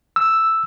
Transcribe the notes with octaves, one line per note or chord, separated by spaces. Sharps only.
E6